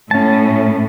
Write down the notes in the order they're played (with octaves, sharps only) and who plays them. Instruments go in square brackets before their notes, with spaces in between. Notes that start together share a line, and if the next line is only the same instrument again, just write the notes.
[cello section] A2 [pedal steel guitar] C#4 A5